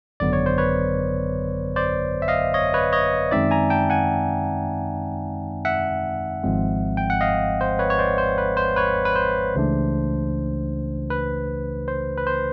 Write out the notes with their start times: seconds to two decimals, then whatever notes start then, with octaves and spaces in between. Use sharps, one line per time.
0.20 G#1 F#2 D3 F#3 B3 D5
0.33 C#5
0.46 C5
0.58 B4 C#5
1.76 C5 D5
2.22 E5
2.28 D#5 F5
2.54 C#5 D#5
2.74 B4 C#5
2.92 C#5 D#5
3.31 F#2 D#3 G#3 C4 D#4 D5 E5
3.51 G#5 A#5
3.70 G5 A5
3.90 F#5 G#5
5.65 E5 F#5
6.43 G#1 G#2 F3 G#3 C4
6.97 G5
7.10 F#5
7.21 D#5 F5
7.61 C5
7.79 B4 C#5
7.90 C#5
7.99 C5 D5
8.18 C5
8.38 B4
8.57 C5
8.76 B4 C#5
9.05 B4
9.16 C5
9.55 C#2 C#3 E3 A3 D4
11.10 B4
11.88 C5
12.18 B4
12.27 C5